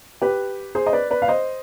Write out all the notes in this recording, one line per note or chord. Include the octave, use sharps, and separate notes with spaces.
G4 B4
G#4 C5
D#5
B4 D5
B4 D5
F5
C5 D#5